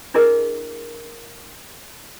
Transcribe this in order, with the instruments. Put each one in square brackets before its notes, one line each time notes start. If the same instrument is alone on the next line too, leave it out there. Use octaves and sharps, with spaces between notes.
[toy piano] D4 E4 G#4 A#4 D#5